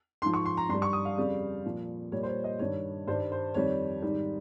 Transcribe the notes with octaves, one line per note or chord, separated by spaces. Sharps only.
G#2 F3 C6
C#6
C6
A#5
G2 C6
G3
C#6
D#6
F5
F2 C#3 G3
A#2 F3
A#2 G3 C#5
C5
C#5
D#5
G2 D#3 G3 C#5
G2 D#3 G3 C5
C5
F2 D#3 G3 C#5
G#2 D#3 G3